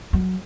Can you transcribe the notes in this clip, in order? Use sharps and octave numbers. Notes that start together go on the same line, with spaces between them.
F#3